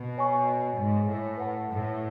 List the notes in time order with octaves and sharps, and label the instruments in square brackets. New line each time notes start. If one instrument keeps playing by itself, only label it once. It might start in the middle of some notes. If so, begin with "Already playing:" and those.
Already playing: [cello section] B2
[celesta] C#5 G#5 C#6
[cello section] G#2
A2
[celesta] B4 F#5 A5
[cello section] A2